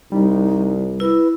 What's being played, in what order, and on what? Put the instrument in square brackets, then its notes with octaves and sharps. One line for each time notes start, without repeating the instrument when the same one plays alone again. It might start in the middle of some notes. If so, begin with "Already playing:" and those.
[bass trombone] C2 [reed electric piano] G3 [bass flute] D#4
[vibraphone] E4 E6 [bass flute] B4